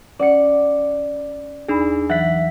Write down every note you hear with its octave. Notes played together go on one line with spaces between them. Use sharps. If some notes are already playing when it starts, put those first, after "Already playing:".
C#4 D5 F#5 C#7
E2 D4 D#4 G#4 B5
E3 F#3 E5 F#5 B6